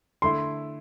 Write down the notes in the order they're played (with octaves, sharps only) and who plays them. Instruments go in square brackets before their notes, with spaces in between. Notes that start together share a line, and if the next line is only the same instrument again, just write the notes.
[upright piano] D3 A3 E4 [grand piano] C6